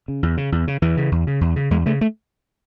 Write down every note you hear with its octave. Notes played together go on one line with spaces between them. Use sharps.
C#3
E2
C#3
E2
C#3
E2 E3
C#3
E2
C#3
E2
C#3
E2 G#3
C#3 A3
A3